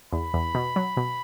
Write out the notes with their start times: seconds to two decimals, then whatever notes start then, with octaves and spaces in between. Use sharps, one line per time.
0.13 E2 B5
0.34 E2
0.55 B2
0.76 F#3
0.97 B2